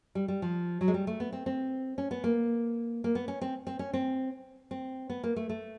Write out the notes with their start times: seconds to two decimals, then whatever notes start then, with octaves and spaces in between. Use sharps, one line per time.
0.15 G3
0.28 G3
0.42 F3
0.81 F#3
0.88 G#3
0.94 G3
1.07 A3
1.20 B3
1.33 C4
1.46 C4
1.98 C#4
2.11 B3
2.24 A#3
3.04 A#3
3.15 B3
3.28 C#4
3.41 C4
3.67 C4
3.79 C#4
3.93 C4
4.71 C4
5.10 B3
5.23 A#3
5.36 A3
5.49 A3